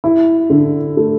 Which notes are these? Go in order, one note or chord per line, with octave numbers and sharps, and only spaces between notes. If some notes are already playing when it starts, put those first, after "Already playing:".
E4
D3
A3